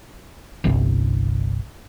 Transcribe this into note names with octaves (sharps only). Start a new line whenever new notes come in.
G1 C2